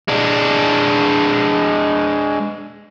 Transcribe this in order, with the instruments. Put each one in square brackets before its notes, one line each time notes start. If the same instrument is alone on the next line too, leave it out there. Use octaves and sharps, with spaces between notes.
[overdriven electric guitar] G#3 D4